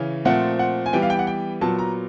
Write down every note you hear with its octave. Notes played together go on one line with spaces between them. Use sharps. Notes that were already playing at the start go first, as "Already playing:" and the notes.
Already playing: C#3 E3 C#4
A#2 F3 A3 C4 F#5
F#5
G#5
E3 G3 B3 G5
F5
G5
F#5
G5
A#2 F#3 B3 A5
A#5